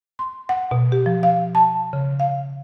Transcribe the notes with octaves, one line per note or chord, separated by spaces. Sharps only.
C6
F#5
B2
G4
F3
F5
A5
C#3
F5